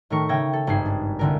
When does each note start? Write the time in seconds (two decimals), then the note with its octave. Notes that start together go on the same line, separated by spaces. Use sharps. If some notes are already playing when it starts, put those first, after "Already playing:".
0.10 A2 D#3 A3 A#4 C#6
0.29 C#3 E5 G5 G#6 A#6
0.53 A4
0.67 G#1 G2 D#4 G#4 C7
0.86 D4
1.19 C2 D3 A#4